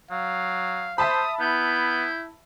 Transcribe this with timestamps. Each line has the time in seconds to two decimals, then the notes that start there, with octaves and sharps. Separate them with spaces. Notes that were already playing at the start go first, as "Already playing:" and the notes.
0.11 F#3 F5
0.98 C5 E5 A5 B5 D#6
1.40 B3 E4 G6